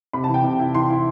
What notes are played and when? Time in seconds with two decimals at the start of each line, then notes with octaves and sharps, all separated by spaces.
0.13 C3 B5
0.24 A5
0.28 E3
0.34 G5
0.44 C3
0.59 E4
0.75 E3 C6
0.90 E4